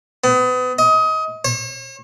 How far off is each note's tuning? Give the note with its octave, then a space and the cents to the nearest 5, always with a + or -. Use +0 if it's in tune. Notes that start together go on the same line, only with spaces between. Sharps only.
B3 +35
D#5 +25
C#5 -45